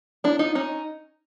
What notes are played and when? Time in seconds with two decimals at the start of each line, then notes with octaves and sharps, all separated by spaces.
0.24 D4 E4
0.39 D#4 F4
0.55 C#4 D#4